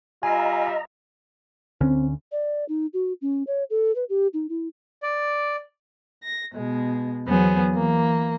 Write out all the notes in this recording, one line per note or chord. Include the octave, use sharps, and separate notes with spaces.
G3 F4 D#5 E5 G#5 A#5
D2 D3 C4 C#4
D5
D#4
F#4
C#4
C#5
A4
B4
G4
D#4
E4
D5
A#6
B2 G#3
E2 F#3 B3 G#4 C5
E3 A#3